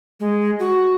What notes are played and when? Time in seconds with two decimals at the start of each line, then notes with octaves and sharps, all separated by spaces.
0.20 G#3
0.59 F#4